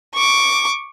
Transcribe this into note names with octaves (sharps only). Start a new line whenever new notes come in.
C#6 D6